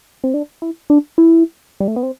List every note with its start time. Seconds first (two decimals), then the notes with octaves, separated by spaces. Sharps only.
0.24 C4
0.34 D4
0.62 E4
0.90 D4
1.18 E4
1.80 G3
1.88 A3
1.96 B3
2.03 C4